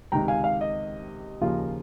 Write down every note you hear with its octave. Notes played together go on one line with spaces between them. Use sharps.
C#2 C3 D#3 G5 A#5
F5 G#5
F5
D#5
D#2 C#3 F3 A#3 F4